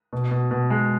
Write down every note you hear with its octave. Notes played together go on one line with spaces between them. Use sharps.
B2
B2
B2
G#3